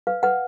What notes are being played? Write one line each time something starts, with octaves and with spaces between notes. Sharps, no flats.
B4 F5
B4 F#5